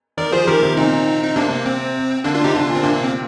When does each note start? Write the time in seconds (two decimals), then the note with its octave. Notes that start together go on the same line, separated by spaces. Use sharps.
0.17 D#3 A#4 D5
0.32 F3 G#4 C5
0.47 D#3 G4 A#4
0.63 C3
0.77 A#2 C4 D#4
1.24 D#4
1.36 C3 A#3 D4
1.51 A#3
1.66 C4
2.24 D3 A#3 D4
2.34 D4 F4
2.44 C3 D#4 G4
2.54 D3 D4 F4
2.68 A#2
2.75 C4
2.83 C3 A#3 D4
2.94 A#3
3.03 C4